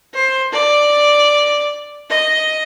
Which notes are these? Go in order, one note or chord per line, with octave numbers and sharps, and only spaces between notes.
C5
D5
D#5